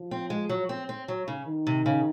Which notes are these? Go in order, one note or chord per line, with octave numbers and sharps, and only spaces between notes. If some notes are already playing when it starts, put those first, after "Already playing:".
Already playing: F3
C4
G#3
F#3
C4
C4
F#3
C#3
D#3
C3
C#3